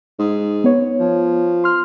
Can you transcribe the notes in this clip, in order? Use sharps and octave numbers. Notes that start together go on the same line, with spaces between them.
G#2
B3 C#5
F3
C6 F6